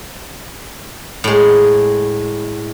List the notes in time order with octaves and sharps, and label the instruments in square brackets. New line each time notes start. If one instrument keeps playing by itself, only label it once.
[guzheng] A2 G#3